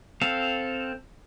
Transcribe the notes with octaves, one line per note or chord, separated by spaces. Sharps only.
C4 A4 F5